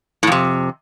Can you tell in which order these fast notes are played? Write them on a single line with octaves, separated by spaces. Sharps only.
A2 F2 C3